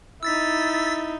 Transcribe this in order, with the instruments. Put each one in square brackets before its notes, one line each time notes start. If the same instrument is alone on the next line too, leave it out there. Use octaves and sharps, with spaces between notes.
[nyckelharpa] D#4 E4 [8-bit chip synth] E6 A6 B6